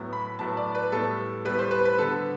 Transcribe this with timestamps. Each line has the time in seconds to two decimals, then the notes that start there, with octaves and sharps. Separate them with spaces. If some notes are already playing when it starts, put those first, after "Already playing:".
Already playing: A2 F#3 B3
0.13 B5
0.39 A2 F#3 B3 A5
0.57 D5
0.75 B4
0.92 A2 G3 B3 A4
1.45 A2 G3 B3 B4
1.59 C5
1.71 B4
1.85 B4
1.99 D3 G3 B3 A4